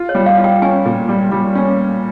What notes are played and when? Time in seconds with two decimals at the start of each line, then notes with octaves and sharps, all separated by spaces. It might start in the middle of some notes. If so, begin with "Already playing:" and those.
Already playing: F4
0.09 C#5
0.15 G3
0.26 F5
0.38 F4
0.44 G5
0.62 C#4 G#5
0.85 A#2
1.09 G3
1.32 G3
1.55 C#4